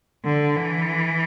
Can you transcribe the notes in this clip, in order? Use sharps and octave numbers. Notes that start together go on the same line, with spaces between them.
D3
E3